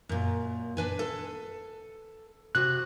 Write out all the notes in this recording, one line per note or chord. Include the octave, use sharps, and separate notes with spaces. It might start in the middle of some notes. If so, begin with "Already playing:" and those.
F#2 A#2
D4 B4 G#5
A4
C3 F#4 F#6